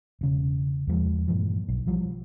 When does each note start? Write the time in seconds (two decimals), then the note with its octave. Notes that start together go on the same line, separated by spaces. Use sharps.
0.21 E1 C#3
0.87 E2 F3 G#3
1.28 G2 A#2 E3 F3
1.68 B1
1.87 E3 F3 G3